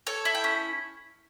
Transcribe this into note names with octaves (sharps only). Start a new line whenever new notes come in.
A4 C#5
E4
G5
C#4